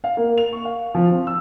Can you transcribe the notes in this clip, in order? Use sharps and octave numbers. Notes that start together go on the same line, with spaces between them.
F5
A#3
F7
C#6
F5
F3
C4
E6